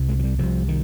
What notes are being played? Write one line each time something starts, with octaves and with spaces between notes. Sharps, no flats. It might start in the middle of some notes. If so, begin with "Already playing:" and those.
Already playing: C2 C3
G#3
F3
G3
C2 C3 F3
D#3